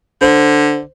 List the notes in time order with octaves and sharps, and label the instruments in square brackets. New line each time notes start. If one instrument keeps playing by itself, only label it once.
[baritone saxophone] D3 [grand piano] C5